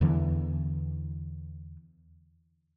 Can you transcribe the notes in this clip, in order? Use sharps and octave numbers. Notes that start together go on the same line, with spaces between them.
E2 D3 E3